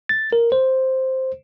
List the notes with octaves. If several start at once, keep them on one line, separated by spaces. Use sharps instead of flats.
A6
A#4
C5